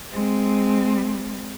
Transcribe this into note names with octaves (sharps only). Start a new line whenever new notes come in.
G#3 C4